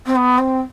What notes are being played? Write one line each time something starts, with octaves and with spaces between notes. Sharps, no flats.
C4
B3
C4